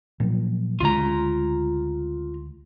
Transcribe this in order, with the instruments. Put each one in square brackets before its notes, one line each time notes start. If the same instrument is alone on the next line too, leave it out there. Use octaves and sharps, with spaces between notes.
[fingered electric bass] A#2 F3 F#3
[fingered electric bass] D2 C#3 G#3 [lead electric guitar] F4 A#5